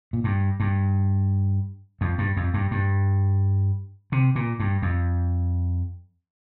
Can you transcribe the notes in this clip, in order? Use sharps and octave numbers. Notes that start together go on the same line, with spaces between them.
A#2
G2
G2
F2
G2
F2
G2
G2
C3
A#2
G2
F2